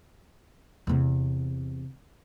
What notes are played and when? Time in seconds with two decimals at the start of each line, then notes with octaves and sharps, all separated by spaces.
0.87 E2 C3